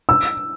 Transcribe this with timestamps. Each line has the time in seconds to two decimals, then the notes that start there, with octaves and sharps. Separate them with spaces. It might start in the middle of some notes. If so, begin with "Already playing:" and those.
0.09 E6